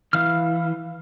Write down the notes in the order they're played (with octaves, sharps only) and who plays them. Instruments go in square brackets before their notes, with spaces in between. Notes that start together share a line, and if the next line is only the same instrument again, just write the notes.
[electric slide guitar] E3 [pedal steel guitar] F5 F6